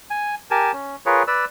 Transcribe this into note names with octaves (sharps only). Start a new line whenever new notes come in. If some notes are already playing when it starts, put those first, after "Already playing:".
G#5
G4 A#4 G#5 A5
C#4
F4 G#4 A#4 B4 C#5
B4 D5 E6